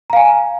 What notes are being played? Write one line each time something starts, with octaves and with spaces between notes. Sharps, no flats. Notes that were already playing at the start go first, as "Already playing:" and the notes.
F5 G#5 A#5